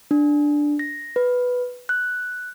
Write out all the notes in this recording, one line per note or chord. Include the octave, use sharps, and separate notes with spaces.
D4
A#6
B4
F#6